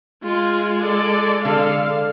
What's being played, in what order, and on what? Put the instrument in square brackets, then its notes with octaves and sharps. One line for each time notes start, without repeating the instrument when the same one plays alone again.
[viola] G#3 [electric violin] F4
[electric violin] A4 D5
[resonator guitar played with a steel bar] D3 A4 [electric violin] F5